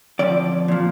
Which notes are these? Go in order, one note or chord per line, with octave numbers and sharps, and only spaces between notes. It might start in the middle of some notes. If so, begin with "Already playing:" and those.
F2 D3 F3 D5
A#2 F3